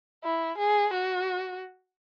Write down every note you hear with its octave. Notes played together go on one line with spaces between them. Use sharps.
E4
G#4
F#4